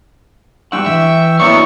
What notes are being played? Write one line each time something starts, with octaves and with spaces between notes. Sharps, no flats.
G3 D4 F#5 G5 C#6 E6
E3 E5
F#3 A#3 B3 D4 E4 D5 E5 C#6